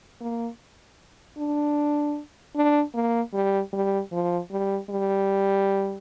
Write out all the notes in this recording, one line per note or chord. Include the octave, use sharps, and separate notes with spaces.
A#3
D4
D4
A#3
G3
G3
F3
G3
G3